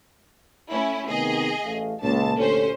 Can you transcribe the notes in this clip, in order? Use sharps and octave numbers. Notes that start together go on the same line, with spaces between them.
A3 C#4 E4
C3 D#3 B3 G#4 D#5
A1 A3 F5
C#2 A#2 A5
D2 C3 C#4 A4 C5